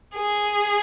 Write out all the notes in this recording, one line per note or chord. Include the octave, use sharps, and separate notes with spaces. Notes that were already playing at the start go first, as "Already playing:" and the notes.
G#4